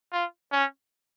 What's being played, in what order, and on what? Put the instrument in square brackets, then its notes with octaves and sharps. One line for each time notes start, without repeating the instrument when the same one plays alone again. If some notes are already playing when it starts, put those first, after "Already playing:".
[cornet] F4
C#4